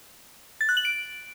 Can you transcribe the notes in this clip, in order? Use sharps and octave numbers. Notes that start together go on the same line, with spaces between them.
A6
F#6
F#7
D7